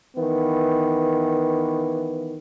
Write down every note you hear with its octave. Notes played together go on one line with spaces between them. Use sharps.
D#3 E3 B3